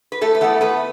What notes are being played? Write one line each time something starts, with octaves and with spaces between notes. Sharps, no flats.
B4
A2 A3 A4
B4
E3 A3 B3 A4
A2 B3 B4